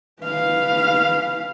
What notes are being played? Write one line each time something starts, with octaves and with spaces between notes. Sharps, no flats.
B4 F5